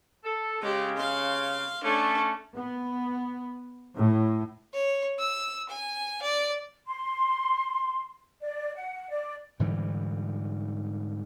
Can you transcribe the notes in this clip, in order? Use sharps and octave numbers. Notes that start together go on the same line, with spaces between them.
A4
C#3 G#3 G4
F5 C6
A3 C#4 D4
B3
A2
C#5
E6
G#5
D5
C6
D5
F#5
D5
G#2 D3 E3 G3